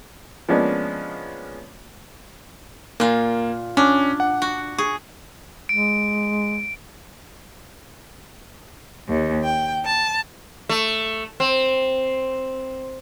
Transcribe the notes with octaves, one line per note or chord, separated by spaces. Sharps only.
F3 G#3 A#3 B3 C#4 D4
A#2 A#3 F4
C#4 D4
F#5
F#4
G#4 C#6
G#3 D7
D#2
G5
A5
A3
C4